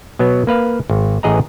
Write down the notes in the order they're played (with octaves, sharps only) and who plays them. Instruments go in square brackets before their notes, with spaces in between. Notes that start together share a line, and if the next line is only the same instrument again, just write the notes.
[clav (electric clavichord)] B2 F#3 B3
A#3 B4 F5
G#1
A1 E3 G#4 D#5 F#5 A#5